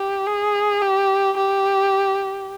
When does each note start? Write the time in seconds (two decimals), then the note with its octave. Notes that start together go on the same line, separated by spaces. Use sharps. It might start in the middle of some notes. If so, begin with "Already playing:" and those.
Already playing: G4
0.26 G#4
0.82 G4
1.37 G4